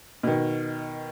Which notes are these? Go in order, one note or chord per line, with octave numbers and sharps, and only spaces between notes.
B2 D#3